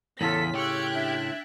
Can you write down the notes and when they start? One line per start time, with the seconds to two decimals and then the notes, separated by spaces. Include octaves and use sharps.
0.21 E2 A2 C#3 F4 A4 B6
0.55 G4 G5 C#6 E6 F#6 G#6
0.94 D4 E5